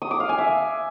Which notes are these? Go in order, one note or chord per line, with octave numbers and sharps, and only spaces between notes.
D#6
D6
F5
G#5
E5